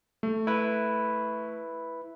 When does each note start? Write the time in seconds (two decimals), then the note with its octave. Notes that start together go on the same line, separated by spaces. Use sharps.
0.23 A3
0.47 E4 B4